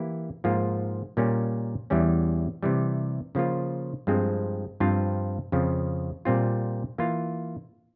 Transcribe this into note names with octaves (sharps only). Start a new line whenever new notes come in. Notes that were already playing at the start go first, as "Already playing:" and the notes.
Already playing: E3 A#3 E4 G4
G#2 F3 A#3 F4
A#2 G3 A#3 C#4
E2 E3 G3 C#4
C3 E3 G3
C#3 F3 A#3 F4
G2 F3 G#3 C4
G2 F3 C4 F4
F2 C#3 F3
A#2 G3 C4 F4
E3 A#3 F4